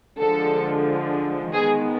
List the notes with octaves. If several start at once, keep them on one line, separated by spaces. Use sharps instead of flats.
D3 F3 G#3 A4
D#3 G#3 B3 G#4